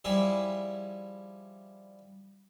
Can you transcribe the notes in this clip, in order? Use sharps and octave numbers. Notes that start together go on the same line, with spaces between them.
F3 G3 E4 G#4 E5